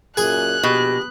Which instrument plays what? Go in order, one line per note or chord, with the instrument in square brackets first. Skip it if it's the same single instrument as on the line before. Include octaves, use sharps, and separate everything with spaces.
[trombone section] F#2 A#2 [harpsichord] G#4 G#5 [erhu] F#6
[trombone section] A#1 G4 [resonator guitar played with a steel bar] B2